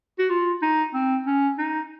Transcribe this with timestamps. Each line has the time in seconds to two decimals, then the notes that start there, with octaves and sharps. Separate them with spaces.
0.19 F#4
0.30 F4
0.62 D#4
0.94 C4
1.27 C#4
1.58 D#4